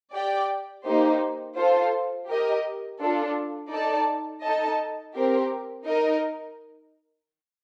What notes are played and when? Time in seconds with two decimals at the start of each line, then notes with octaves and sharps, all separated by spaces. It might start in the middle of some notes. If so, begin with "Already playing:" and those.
0.14 G4 D5 G5
0.85 A#3 D#4 G4 C5
1.57 F4 A4 C5
2.29 G4 A#4 D#5
3.01 D4 F4 A4
3.71 D#4 A4 D5 A5
4.43 D#4 A4 D#5 A5
5.15 C4 G4 A#4
5.87 D#4 A#4 D#5